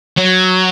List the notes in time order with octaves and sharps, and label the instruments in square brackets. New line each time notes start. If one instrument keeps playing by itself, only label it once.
[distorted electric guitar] F#3